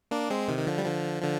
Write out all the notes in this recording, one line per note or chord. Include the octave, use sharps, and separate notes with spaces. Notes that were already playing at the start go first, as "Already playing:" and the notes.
A#3 D4
G#3 C4
C3 D#3
D#3
D3 F3
G3
D3 F3
D3 F3